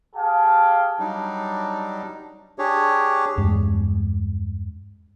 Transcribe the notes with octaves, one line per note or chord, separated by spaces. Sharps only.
G4 G#4 F5 G5 A5
F#3 G3 D4 D#4
D4 G4 G#4 C#5
E2 G2 G#3